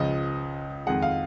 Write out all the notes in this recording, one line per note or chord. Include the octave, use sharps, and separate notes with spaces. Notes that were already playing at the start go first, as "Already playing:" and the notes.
Already playing: C#2 C#3 F3 D#5
F2 D#3 G#3 F#5
F5